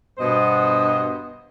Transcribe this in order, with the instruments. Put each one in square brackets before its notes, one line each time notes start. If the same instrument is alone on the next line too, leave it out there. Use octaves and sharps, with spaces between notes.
[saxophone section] G2 B2 B3 C5 D#5